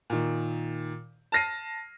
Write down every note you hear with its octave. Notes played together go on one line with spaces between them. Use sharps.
A#2 D#3
A5 F6 A#6 C7 D#7